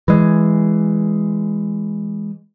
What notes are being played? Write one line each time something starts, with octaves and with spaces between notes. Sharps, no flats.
E3 G#3